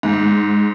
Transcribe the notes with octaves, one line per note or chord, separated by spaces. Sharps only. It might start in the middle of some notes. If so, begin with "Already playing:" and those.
G#2